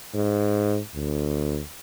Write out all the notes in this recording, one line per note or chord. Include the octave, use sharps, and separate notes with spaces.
G#2
D2